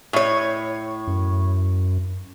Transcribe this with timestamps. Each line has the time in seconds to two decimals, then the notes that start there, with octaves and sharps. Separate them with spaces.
0.13 A2 C#5
1.07 F#2